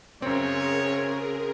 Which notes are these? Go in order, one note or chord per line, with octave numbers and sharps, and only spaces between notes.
F#2 C#3 C4 G#4 A#4 C#5